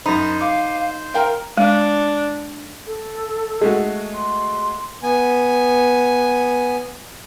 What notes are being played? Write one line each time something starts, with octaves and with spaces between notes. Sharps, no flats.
F#2 D#4 C5 B5
F5 D6
A#4 F5 G5 A#5
G#3 D4
A4
G#3 A3 F#4
C6
B3 G#5